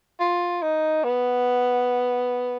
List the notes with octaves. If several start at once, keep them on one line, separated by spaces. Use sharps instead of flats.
F4
D#4
B3